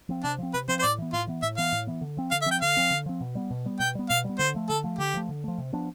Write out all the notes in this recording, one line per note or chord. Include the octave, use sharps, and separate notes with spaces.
F3 C4
C3 D4
F3 C4
C3 B4
F3 C4 C5
C5
A2 D5
E3 B3
A2 F4
E3 B3
A2 E5
E3 B3 F5
A2
E3 B3
D3
F3 C4
D3 F5
E5
F3 C4
G5
D3 F5
F3 C4
D3
F3 C4
B2
G3 B3
B2
G3 B3
B2 G5
G3 B3
B2 F5
G3 B3
D3 C5
F3 A3
D3 A4
F3 A3
D3 G4
F3 A3
D3
F3 A3
C3
F3 B3 D4